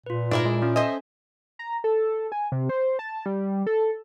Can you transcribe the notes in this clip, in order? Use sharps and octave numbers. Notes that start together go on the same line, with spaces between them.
A#2 F4 B4
G#2 D4 E4 A#4 D5
G#3
C#4 F4
A4 C5 D#5 E5 G#5
A#5
A4
G#5
C3
C5
A5
G3
A4